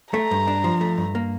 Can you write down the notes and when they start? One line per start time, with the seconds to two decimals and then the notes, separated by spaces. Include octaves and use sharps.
0.14 A3 A#5
0.31 G2
0.48 D4
0.64 F3
0.81 A3
0.98 G2
1.15 A#3